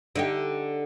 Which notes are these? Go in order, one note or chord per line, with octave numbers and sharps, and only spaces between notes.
D3 D#4 G4